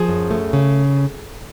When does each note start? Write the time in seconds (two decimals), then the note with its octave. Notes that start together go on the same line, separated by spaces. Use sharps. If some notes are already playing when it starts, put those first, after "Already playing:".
Already playing: F3 G#4
0.08 F#2
0.31 A3
0.53 C#3